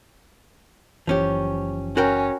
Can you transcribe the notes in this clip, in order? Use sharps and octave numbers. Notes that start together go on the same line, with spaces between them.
F#1 E3 F3 C#4 G4
C#4 F#4 A#4 G5